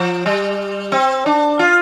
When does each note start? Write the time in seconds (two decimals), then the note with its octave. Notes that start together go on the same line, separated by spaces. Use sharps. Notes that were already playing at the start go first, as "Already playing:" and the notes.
Already playing: F3
0.26 G3
0.92 C4
1.26 D4
1.59 F4